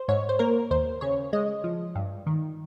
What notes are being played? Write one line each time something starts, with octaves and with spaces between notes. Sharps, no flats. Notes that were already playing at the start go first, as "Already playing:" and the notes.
Already playing: C5
G#2 C#5
C5
A#3 A#4
D#2 C5
C#3 C#5
G#3 D#5
F3
G2
D#3